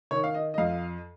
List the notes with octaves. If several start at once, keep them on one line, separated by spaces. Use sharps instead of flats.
D#3 C#5
F5
D#5
D#5
F2 F5